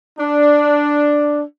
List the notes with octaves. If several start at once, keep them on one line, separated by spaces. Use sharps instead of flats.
D4